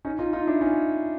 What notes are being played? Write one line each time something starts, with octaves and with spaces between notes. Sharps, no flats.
C#4 D#4
D#4 F4
D#4 F4
D4 E4
C#4 D#4